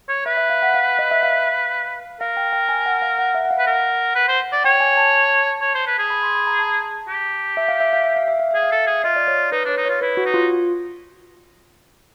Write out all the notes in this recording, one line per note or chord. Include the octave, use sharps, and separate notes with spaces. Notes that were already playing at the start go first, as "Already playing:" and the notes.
C#5
B4 E5
E5
F5
F#5
F5
D#5
E5
F5
A#4 F5
G5
G5
G#5
F#5
F5
F#5
E5
F#5
F5
B4
A#4 F#5
B4
C5
D5
C#5 G5
G#5
A5
C#5
C5
B4
G#4
B5
C6
B5
A#5
A5
G4
E5
F5
E5
F5
E5
F5
E5
F5
G#4 E5
F5
A4 E5
G#4
F4 D#5
D5
C#5
D#4 B4
D4 C#5
D#4
F4 C#5
E4 B4
F#4
D#4
F4